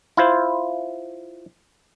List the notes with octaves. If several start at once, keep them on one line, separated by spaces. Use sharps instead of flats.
E4 F4 C5